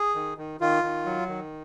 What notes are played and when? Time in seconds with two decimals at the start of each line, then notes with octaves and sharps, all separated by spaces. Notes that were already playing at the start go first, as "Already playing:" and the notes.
Already playing: G#4
0.15 D#3
0.38 D#3
0.60 D#3 F4
0.83 D#3
1.06 F#3
1.29 D#3